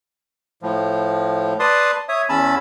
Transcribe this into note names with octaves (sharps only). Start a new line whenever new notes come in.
A2 F3
B4 D5 A5 C6 D#6
C#5 E5 D#6
E2 C#4 A5 B5 E6